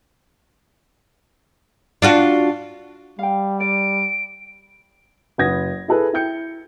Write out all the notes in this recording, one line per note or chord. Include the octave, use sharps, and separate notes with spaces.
D4 F4 F#4
G3 F5 G5
D5 D7
F#1 B4 F#5 D#6 G#6 A#6
E4 G#4 A4 B4
E4 G5 G6 C#7